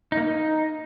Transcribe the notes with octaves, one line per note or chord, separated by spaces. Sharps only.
D#4
A#3
D#4